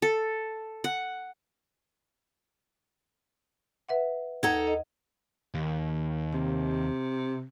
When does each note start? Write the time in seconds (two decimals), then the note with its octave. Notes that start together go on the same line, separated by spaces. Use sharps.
0.02 A4
0.84 F#5
3.89 B4 E5 F#5
4.43 D#2 D#4 A4 F#5 A#5 G#6
4.67 D#5
5.55 D#2
6.33 C3